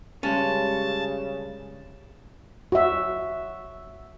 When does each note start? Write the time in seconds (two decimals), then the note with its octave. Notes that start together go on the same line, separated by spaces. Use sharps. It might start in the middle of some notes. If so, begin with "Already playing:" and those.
0.23 G2 C#3 G#3 C#4 A5
2.72 F#4 E5